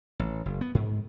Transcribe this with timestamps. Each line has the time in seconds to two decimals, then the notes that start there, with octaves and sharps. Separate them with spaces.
0.19 A1
0.46 F#1
0.61 B3
0.75 G#2